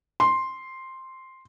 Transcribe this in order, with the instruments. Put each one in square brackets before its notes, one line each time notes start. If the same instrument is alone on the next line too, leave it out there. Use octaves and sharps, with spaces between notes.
[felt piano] C6